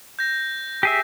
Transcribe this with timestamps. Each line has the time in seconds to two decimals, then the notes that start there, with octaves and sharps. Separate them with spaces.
0.19 G6 A#6
0.83 G4 G#4 E5